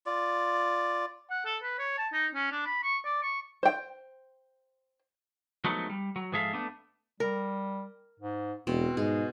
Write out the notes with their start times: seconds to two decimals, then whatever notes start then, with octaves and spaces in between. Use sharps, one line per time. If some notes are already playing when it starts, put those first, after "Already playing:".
0.06 F4 D5
1.30 F#5
1.45 A4
1.63 B4
1.79 C#5
1.98 A5
2.13 D#4
2.35 C#4
2.52 D4
2.66 B5
2.83 C#6
3.05 D5
3.22 C#6
3.63 C5 G5
5.64 F3 F#3 G#3 A3 B3 D#4
5.90 G3
6.16 F#3
6.32 G#2 F3 G#4 A4 E5 F5
6.53 A3 B3 D4
7.20 G3 A#4
8.20 G#2
8.67 E1 B2 C4
8.97 G#2 G#3 G#4